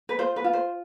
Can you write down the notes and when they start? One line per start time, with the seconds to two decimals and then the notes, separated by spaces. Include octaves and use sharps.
0.09 B4
0.18 F4 C5
0.36 B4
0.44 F4
0.53 C5